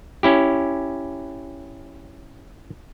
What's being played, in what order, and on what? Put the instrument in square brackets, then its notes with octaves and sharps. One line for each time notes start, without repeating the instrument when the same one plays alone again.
[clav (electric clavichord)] C#4 E4 G4